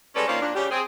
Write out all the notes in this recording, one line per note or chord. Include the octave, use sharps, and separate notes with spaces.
G3 G#3 C#4 A4 B4 D5
D#3 A#3 C#4 F4 C5 D5
A#2 D4
C#3 G3 G4
C4 G#4